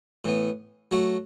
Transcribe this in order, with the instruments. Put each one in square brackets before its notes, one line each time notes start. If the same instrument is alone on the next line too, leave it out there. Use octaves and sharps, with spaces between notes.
[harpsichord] A2 E3 B3
F#3 A3 F#4